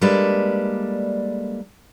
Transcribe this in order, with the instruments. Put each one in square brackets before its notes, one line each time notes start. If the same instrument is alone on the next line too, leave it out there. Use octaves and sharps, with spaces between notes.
[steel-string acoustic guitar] G3 G#3 A#3 D4 A4 B4